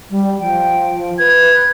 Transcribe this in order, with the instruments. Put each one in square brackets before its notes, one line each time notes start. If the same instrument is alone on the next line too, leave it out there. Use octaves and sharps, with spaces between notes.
[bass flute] G3
[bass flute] F3 [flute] G5
[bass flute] B4 [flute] G#6